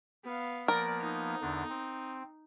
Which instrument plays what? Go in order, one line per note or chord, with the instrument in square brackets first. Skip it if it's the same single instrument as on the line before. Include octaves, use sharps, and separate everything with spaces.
[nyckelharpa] B3 F5
[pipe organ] F3 A#3 B3 [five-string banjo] A#4 [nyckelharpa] D5
[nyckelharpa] D#4
[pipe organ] E2 D3 D4
C4